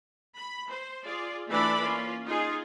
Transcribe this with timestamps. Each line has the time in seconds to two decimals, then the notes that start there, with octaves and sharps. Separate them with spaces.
0.37 B5
0.70 C5
1.05 F4 G#4 D5
1.50 E3 A3 D4 A4 D5 B5
1.82 A#3 C#4 F4
2.27 D#4 F4 G#4